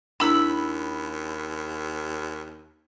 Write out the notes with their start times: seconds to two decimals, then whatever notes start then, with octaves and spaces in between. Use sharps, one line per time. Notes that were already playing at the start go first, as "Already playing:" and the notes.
0.20 D#2 D4 E4 A#5 B5 E6